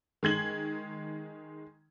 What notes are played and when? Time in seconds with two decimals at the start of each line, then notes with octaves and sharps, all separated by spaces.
0.23 D#3 G#3 G#6 F#7